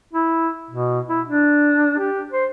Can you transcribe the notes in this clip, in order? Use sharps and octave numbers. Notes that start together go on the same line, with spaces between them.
E4
B2
E4
D4
G4
C5